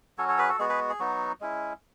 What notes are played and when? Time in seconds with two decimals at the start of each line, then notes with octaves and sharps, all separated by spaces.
0.18 F#3 C#4 F#4 A4 C#5
0.28 A4 C#5
0.38 G#4 B4
0.49 F#4 A4
0.59 G#3 B3 F#4 G#4
0.69 G#4 B4
0.89 G#4
1.00 F#3 B3 D#4 F#4
1.41 G#3 C#4 E4